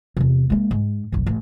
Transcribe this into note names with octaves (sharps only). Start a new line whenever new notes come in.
E2 C3
G#3 A#3
G#2
F#1 B1
A1